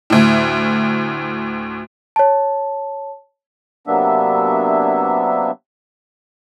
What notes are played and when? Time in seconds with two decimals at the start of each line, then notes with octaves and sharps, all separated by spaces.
0.10 D2 A2
2.16 C#5 A5
3.87 C3 F#3 A#3 B3 D4 E5